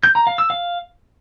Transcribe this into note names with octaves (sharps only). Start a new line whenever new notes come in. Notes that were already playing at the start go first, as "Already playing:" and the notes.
G6
A#5
F5
E6
F5